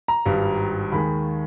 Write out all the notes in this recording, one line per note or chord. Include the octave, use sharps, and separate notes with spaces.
A#5
G#1 G2 G3
D#2 D#3 G#3 B5